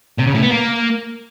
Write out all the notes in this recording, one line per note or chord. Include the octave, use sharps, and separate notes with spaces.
C3
C#3
A2
B3
A#3